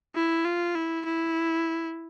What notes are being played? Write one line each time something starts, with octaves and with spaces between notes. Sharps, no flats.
E4
F4
E4
E4